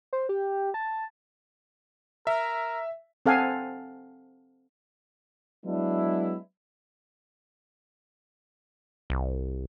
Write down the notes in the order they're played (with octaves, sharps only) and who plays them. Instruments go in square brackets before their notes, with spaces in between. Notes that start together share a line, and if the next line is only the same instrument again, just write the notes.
[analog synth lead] C5
G4
A5
[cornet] A#4 [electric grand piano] E5
[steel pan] C4 A4 F5 F#5 G#5
[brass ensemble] F#3 G#3 B3 D4 E4
[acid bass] C2